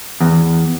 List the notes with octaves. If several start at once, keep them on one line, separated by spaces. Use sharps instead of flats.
E2